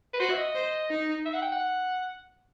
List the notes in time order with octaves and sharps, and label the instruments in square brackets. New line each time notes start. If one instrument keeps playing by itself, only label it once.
[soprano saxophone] B4
[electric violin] F#4 [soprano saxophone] C5
[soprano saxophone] E5
D#5
[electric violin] C5
D#4
[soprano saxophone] E5
F#5
G5
F#5